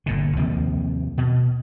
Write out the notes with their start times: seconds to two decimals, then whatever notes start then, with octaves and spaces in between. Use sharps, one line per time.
0.06 G1 A#2 D3
0.37 D#2 C3 F3 A#3
1.18 B2